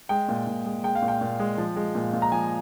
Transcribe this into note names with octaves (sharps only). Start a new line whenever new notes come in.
G#3 G5
A#2
A#2
G#3
G#3 G5
F5
A#2
G5
A#2
G#3
F3
G#3
A#2
A#2
A#5
F3 G#5